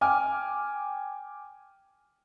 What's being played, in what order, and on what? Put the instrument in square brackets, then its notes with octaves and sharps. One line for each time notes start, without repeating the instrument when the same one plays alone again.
[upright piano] G5 G#5 D6 F6